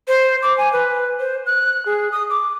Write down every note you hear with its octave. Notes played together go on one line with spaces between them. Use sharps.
C5
D6
G#5
B4
C5
F#6
G#4
D#6
D6